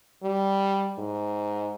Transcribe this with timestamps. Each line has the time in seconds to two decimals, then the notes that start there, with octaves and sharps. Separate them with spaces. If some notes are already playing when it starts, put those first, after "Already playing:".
0.23 G3
0.98 G#2